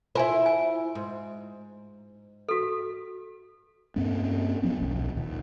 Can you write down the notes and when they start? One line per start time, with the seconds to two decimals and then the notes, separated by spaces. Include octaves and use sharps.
0.15 E4 F4 C5 G#5
0.46 G#5
0.95 G#2
2.49 F#4 A4
3.96 G2 A#3 C4 C#4
4.63 F3 F#3 B3 C#4
4.77 D#1 B1
5.16 D#1 D#2